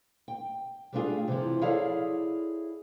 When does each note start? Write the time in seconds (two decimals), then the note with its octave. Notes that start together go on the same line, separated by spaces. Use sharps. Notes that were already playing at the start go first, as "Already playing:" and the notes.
0.28 G5
0.93 G3 A3 B3 D4 F4 G#4
1.28 C3 E3 F3
1.61 E4 G#4 A4 C#5 D5 F5